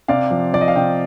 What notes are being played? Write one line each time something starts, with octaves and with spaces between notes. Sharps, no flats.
C3 D5 F5
F3
F3 D5
D#5
F5
C3 D#5 G5